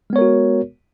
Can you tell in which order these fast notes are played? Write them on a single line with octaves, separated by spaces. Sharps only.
G#3 B3 C#5 A#4 F#4